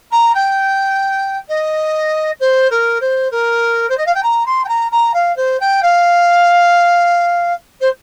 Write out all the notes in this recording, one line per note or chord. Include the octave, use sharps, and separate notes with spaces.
A#5
G5
D#5
C5
A#4
C5
A#4
C5
D#5
F5
G5
A#5
C6
G5
A#5
A#5
F5
C5
G5
F5
C5